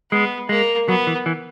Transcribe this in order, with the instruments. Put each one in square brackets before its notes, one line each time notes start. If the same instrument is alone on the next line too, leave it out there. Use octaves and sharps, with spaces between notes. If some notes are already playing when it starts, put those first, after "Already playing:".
[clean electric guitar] G#3 [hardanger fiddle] B3
[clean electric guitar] G#3 [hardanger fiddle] A#3
[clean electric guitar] F#3 [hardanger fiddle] B3
[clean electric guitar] E3
E3